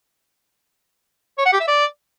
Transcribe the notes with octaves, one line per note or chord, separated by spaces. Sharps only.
C#5
F#5
G4
E5
D5